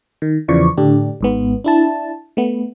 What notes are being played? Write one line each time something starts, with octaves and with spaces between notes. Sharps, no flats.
D#3
E2 C#3 E3 F3 D5 C#6
A2 D3 D4 G4
G#1 G#2 B3
D4 E4 A5
A3 B3